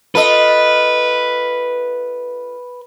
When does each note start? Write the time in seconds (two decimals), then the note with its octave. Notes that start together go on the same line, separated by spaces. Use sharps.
0.15 F4 A4 B4 D#5